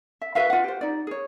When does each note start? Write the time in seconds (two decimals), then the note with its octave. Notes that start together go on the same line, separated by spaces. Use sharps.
0.22 E5
0.35 F#4 B4 E5 F5
0.50 F4 F#5
0.64 G4 C5
0.81 D#4 D5
1.07 G#4 C#5